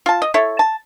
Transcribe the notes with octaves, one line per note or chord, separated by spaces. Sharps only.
F4 A5
D#5
E4 A4 C#5
A5